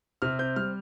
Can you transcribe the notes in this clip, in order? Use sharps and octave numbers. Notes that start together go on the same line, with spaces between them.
C3 F6
C4 G6
G3 F6